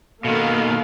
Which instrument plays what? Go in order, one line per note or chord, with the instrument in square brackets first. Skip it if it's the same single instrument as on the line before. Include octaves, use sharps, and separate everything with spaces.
[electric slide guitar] B2 D#3 [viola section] A#3 A4 F5